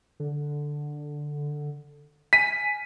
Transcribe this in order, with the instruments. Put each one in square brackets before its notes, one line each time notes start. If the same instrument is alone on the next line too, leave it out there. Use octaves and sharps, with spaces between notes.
[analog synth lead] D3
[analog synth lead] G#5 [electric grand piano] B6 D#7